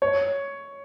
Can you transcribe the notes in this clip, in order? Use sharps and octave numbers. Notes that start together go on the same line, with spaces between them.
C#5